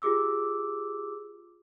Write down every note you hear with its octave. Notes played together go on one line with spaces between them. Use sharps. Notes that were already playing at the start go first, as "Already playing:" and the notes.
F4 G4 G#4 D6 E6